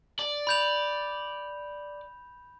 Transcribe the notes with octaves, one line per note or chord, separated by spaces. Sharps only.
D5
B5 G6 F7